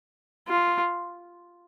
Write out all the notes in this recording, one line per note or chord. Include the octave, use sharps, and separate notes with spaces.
F4